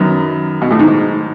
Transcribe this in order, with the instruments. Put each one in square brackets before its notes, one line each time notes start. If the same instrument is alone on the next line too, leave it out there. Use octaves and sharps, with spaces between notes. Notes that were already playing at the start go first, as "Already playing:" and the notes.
Already playing: [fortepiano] F#2 [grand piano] D#3 F#3 B3
[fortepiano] B2
A2
G#2